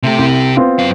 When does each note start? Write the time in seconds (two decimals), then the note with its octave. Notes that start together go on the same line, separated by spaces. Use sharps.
0.03 C3 A3 G4
0.18 C2
0.57 B3 C4 F4
0.79 F#2 F5